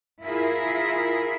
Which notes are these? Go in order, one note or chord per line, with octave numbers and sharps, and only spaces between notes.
E4 F4 G#4 A#4